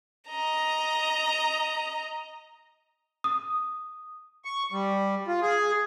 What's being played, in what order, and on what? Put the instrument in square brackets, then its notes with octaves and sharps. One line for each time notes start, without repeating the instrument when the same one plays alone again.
[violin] D#5 A#5
[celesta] D#6
[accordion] C#6
G3
F4
G#4